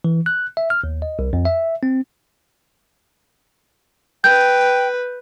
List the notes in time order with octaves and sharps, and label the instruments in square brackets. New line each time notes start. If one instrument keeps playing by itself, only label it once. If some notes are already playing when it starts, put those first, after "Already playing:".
[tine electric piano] E3
F#6
E5
F6
D#2
D#5
C2
F2
E5
C4
[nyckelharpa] B4 [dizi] G5 [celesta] G6